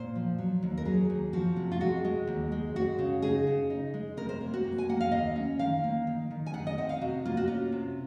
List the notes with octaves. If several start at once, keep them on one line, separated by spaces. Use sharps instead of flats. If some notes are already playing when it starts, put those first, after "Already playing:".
Already playing: A#2 C5
F3
F#3
D#2
A#4
F#3 G#4
D#2
F3 F#4
C3
F4
G#3 F#4
G#3
D#2
G#3
G#3 F#4
C#3
D#4 G#4
C#3
D#4
G#3
C3 A#4
C5
A#3
F#4
A#3
G#5
A#3 F#5
F5
D#2 D#5
C#4
D#3 F5
A#3
D#3
D#3
G#5
D#3 F#5
D#5
C4 F#5
F5
C3 F#4
A#3 F4
F#4
C#4 F4
C3